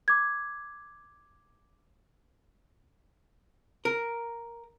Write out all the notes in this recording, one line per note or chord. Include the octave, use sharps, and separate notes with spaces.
D6 G#6
A#4